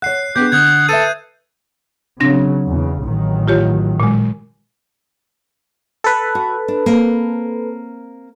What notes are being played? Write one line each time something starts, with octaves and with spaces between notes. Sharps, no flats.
C#5 F#5 F#6 C7
B3 D4 G4 G#4 G6
D3 F#5 D#6 G6 G#6
A4 B4 E5 D#7
C#3 F#3 C4 D4 A#6
E2 C#3
A1 D#3 F#3
F4 G4 C#5
A#2 G#3
A4 B4
F#4
D4
A#3 C4 A#4